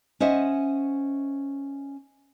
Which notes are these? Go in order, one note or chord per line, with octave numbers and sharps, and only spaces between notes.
C#4 C5 D#5 E5 F#5